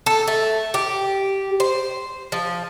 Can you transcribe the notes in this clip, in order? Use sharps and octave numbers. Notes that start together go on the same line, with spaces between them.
A4
A3
G4
C5
F3